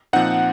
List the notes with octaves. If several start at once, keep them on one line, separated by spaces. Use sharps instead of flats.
A#2 F3 C4 D#4 F#5